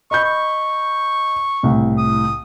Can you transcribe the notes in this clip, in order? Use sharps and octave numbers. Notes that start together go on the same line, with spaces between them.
D#5 B5 C#6 G6
C#6
C2 A2
D#6